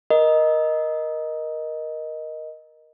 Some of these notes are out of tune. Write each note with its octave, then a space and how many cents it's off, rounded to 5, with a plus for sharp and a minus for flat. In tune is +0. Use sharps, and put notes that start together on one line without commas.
A#4 +15 D#5 +0